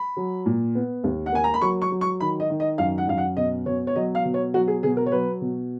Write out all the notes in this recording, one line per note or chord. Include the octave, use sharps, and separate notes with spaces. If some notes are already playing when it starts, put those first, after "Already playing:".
Already playing: B5
F#3
A#2
B3
D#2
F#5
A#3 G#5
A#5
B5
F#3 C#6
C#6
F#3
C#6
D#3 B5
D#5
D#3
D#5
F#2 F5
F#5
F#2 F5
F#5
B2 D#5
B2 C#5
C#5
F#3 D#5
F5
B2
C#5
F#3 F#4
G#4
B2 G#4
A#4
C#5
F#3 B4
B2